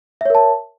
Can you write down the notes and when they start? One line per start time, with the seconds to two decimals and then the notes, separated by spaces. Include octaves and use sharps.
0.21 E5
0.25 C#5
0.30 A#4
0.35 A5